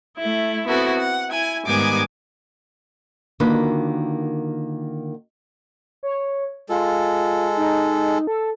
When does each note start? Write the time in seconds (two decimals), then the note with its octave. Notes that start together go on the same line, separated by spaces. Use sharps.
0.18 A3 E4
0.66 B3 C4 E4 F#4 A4
0.98 F#5
1.29 E4 G#5
1.66 G#2 D#3 G3 B3 G#5 D6
3.40 D3 D#3 A#3 F4 F#4 B4
6.03 C#5
6.69 G#3 F4 A4
7.57 D#4
8.27 A4